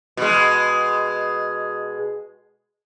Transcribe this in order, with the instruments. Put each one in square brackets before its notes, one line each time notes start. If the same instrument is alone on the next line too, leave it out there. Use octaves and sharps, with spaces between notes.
[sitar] B2 G#3